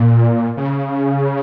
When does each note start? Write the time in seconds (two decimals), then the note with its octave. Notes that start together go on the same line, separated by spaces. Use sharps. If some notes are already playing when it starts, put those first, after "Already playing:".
Already playing: A#2
0.57 C#3